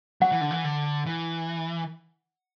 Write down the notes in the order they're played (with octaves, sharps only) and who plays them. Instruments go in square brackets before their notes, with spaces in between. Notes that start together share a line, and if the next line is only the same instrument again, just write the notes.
[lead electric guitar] F#3 [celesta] F#5
[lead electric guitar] E3
D3
E3
D3
E3